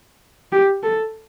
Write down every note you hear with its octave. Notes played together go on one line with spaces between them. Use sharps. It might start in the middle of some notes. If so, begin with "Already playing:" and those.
G4
A4